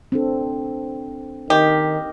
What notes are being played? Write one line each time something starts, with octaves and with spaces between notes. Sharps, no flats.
C4 D4 A4
D#3 D#4 G4 A#4 D#5